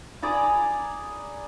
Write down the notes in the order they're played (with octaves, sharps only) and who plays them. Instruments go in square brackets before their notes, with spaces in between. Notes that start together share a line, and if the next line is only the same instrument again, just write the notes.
[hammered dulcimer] G#4 D5 A#5 B5